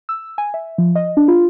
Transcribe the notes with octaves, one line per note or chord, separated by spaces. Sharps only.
E6
G#5
E5
F3
D#5
D4
F4